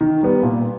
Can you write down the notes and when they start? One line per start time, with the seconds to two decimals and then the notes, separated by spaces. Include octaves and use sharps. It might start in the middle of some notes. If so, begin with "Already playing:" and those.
0.01 D#3
0.23 G3 B3
0.43 A#2